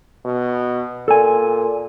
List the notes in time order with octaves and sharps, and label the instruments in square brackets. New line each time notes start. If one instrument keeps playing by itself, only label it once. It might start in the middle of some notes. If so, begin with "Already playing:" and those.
[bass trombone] B2
[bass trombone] A#2 [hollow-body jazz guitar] A4 G#5